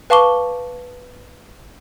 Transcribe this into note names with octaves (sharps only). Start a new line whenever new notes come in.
B4 F5 A5 C#6 D6 G7